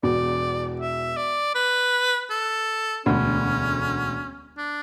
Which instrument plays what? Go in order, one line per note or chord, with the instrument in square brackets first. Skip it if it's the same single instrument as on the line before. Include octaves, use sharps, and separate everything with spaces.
[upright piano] E1 E2 B2 [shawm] D5
[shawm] E5
D5
B4
A4
[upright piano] E1 D2 D3 [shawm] C#4
[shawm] D4